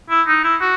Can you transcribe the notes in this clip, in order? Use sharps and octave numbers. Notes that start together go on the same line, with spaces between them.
E4
D#4
E4
F#4